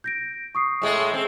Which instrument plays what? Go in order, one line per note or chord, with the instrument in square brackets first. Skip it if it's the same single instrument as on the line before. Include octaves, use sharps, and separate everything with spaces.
[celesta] G6 A#6 D7
C#6 D#6 C7
[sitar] A2 G#3 A3
C4